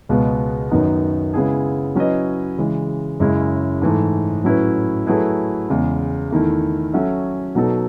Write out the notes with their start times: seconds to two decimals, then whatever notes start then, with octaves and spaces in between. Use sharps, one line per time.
0.09 C#2 B2 G#3 B3
0.71 F#2 D#3 F#3 B3 D#4
1.34 C#3 G#3 B3 E4 G#4
1.95 F#3 C#4 E4 B4 D#5
2.58 C#3 E3 G#3
3.20 F#2 C#3 G#3 C#4 E4
3.82 G#2 E3 A3
4.44 A2 F#3 C#4 E4 B4
5.07 F#3 A3 E4 G#4 B4
5.69 E2 C#3 G#3
6.30 E2 D#3 A3 E4
6.93 F#3 C#4 F#4 A4 E5
7.55 B2 F#3 B3 D#4 A4